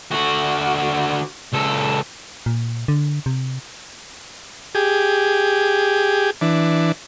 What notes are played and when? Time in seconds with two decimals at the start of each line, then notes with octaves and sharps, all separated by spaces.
0.12 D3 F#4
1.53 C#2 A4
2.46 A#2
2.88 D3
3.26 C3
4.75 G4 G#4
6.41 E3 D4